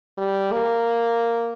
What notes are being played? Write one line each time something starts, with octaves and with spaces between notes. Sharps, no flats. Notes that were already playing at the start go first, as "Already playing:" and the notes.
G3
A#3